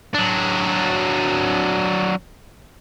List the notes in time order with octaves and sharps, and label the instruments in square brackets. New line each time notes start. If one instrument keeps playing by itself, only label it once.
[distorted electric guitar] F#3 D4